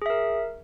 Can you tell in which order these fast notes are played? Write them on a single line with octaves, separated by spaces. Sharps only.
G#4 E5 A#4